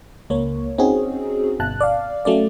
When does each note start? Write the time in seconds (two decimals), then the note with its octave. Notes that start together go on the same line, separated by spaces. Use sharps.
0.30 C#2 A#3 C#5
0.78 C4 C#4 D#4 F#4 G#4
1.60 G1 B2 A5 F#6
1.81 D5 F5
2.25 F#3 A3 C#4 D5